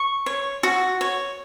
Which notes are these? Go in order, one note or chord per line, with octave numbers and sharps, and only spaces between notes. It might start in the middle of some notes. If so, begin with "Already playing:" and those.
Already playing: C#6
C#5
F#4
C#5